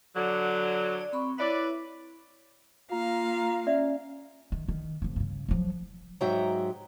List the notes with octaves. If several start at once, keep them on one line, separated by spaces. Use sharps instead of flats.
D3 F#3
D5
C4 B5 C#6
E4 B4 C#5 D5 E5
A#3 F4 F5 A#5
C#4 D5 E5
D#3
D#3
F#1 F3
G2 C#3
F3 F#3
G#2 F#3 G#3 E5 G5 A#5